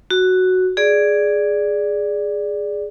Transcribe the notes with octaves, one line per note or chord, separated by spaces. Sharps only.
F#4
G#4 D5